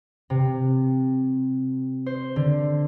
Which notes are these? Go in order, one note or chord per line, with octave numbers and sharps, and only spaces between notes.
C3
C5
D3